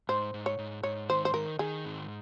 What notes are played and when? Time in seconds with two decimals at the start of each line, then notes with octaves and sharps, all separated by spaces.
0.09 G#2 C5
0.34 G#2
0.46 C#5
0.59 G#2
0.83 G#2 C#5
1.09 D#3 C5
1.25 C5
1.34 D#3 A#4
1.59 D#3 G#4
1.85 G#2